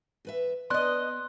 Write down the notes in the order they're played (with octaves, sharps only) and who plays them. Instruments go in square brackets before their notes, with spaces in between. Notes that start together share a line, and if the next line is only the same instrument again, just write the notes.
[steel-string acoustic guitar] E2 B4 E5
[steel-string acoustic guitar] B3 [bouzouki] D4 D#5 [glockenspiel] C6 F#6